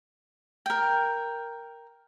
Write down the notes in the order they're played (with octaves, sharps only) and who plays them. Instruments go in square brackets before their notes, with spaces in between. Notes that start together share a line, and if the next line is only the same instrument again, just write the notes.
[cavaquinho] A#4 G5